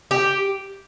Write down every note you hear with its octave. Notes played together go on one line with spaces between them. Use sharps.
G4